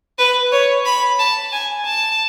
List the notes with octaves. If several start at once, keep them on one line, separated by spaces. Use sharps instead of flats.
B4
C#5
B5
A5
G#5
A5